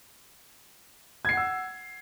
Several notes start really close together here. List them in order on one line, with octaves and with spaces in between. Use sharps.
G#6 C7 F#5 E6